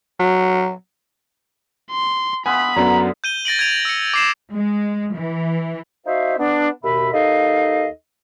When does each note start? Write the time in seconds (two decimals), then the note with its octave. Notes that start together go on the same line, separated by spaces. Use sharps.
0.20 F#3
1.91 C6
2.46 B3 F4 E5 G#5 B5
2.76 F#2 D3 F#3 B3 A#5
3.24 G6 D#7 G7
3.45 A6 A#6 D7 F#7
3.59 G#6 A6 D7 F7
3.85 E6 C#7
4.14 D6 C7 E7
4.53 G#3
5.13 E3
6.06 D#4 F#4 C5 E5 F5
6.38 B3 D4
6.84 D#2 B2 E5 B5
7.13 D#2 D#4 A4 D#5 F5